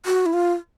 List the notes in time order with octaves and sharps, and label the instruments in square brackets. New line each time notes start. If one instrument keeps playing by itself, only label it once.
[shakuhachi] F#4
E4
F4